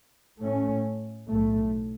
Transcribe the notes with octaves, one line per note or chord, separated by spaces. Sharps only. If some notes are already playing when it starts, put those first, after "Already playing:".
A2 A3 C#4
B1 A2 A3